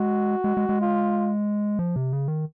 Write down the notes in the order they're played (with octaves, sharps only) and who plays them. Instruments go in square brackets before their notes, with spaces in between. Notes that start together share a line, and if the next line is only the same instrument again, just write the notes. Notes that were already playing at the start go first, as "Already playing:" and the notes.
Already playing: [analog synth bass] G#3 [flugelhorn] F#4
[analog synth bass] G#3
G#3
G#3
[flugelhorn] F4
[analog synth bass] F3
C3
C#3
D#3